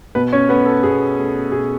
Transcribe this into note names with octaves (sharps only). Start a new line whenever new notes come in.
B2 B3 B4
C#4 C#5
A3 B3 B4
A4
B2 G#4
A3
B2 G#4